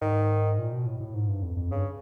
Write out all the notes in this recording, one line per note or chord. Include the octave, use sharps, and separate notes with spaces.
G#2 D#3
A#2
B2
A2
A2
G#2
G2
F2
F2
G2 C#3